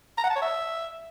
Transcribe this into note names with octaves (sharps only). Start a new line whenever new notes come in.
A#5
F#5
A5
C#5
E5